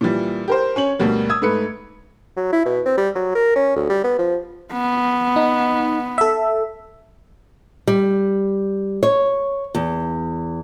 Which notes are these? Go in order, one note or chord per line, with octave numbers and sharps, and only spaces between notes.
A#2 E3 G3
G4 A#4 C5
C#4 C#5 F#7
D2 B2 G3 A#3
D#6 E6 G#6
G#2 A3 B4 C#7
F#3
E4
B2
C4
G3
F#3
A#4
C#4
D2
G3
B3
F3
B3
D#4
A4 E5
G3
C#5
E2